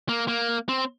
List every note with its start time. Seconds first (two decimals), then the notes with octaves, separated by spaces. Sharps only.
0.09 A#3
0.28 A#3
0.69 C4